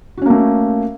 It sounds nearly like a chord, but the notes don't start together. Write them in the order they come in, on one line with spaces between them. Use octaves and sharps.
F#4 C#4 A#3 A3